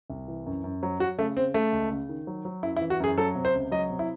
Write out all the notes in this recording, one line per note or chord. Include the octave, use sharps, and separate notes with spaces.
C2
E3
F#2
F#2
F#3
F#3 F#4
C#3 A3
C#3 C4
C#3 A3
C#2
C#3
D#3
F#3
F#3
F#2 E4
E4
E3
F#4
F#2 G#4
F#3 A4
C3
C5
C#2
F#3 D#5
C3
E4